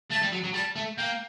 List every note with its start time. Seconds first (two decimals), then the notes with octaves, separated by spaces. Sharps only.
0.11 A3 A5
0.22 G3
0.33 F#3
0.44 F#3
0.54 G3 A5
0.76 A3
0.97 A#3 G5